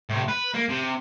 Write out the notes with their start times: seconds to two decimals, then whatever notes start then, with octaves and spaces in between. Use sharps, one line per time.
0.10 A2 C3
0.29 B4
0.55 A#3
0.69 C3